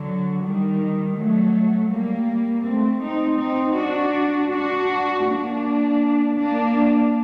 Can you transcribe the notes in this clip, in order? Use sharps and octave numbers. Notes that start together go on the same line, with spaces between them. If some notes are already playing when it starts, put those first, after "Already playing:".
Already playing: D3 F#3
D#3 G3
F#3 A3
G3 A#3
A3 C4
C4 D#4
C4 D#4
D4 F#4
D4 F#4
A#3 D4
A#3 D4